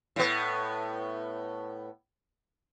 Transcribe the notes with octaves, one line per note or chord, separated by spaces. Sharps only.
A2 B3